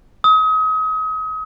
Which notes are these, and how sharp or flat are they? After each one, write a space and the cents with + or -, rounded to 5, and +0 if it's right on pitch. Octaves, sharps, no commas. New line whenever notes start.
D#6 +35